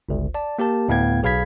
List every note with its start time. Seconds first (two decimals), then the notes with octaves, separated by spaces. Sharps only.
0.09 G1 C#2
0.35 D5 A5
0.59 A#3 G4 A#4 A5
0.88 D2 A2 B3 F5 G5 G#6
1.23 B1 G#4 F5 B5 G#6 B6